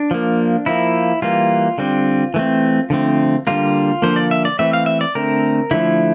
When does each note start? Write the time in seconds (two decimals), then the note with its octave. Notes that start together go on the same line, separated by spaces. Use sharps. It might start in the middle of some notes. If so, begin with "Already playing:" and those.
Already playing: D4
0.11 F3 A#3
0.66 F3 A#3 E4
1.22 E3 G3 A#3 F4
1.78 D3 G3 C4
2.34 E3 A3 C4
2.90 D3 F3 A3 C4
3.47 D3 G3 A#3 F4
4.02 D3 F3 A#3 C5
4.16 D5
4.31 E5
4.45 D5
4.59 E3 A3 C4 E5
4.73 F5
4.86 E5
5.01 D5
5.15 D3 A3 C4 A#4
5.71 D3 F3 A3 E4